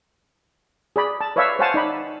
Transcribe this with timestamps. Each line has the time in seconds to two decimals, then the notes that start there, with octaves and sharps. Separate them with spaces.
0.96 G#4 D5 B5
1.21 A5
1.36 B4 C#5 D5 E5 F5 E6
1.59 C5 C#5 F5 F#5 G#5 A5
1.74 D#4 D5 B5